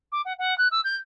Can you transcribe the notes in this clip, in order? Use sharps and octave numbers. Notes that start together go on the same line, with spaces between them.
D6
F#5
F#5
F#6
E6
G6